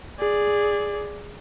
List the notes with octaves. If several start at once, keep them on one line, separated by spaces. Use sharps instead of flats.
G#4 D5